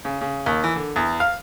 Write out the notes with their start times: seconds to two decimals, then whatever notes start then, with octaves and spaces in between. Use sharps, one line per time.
0.05 C#3
0.21 C#3
0.46 D#2
0.64 E3
0.76 D3
0.96 E2
1.20 F5